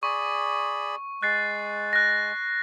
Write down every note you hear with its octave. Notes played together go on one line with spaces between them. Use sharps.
G#4 D5 B5 C#6
G#3 F#6 A6 C7
F#6 A#6